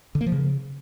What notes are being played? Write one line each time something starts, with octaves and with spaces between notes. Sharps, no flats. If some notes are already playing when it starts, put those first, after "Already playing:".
D3
A#3
F3
C#3